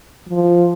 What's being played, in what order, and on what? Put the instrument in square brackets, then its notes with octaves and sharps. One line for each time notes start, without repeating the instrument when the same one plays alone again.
[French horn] F3